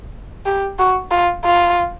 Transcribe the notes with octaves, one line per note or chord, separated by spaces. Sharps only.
G4
F#4
F4
F4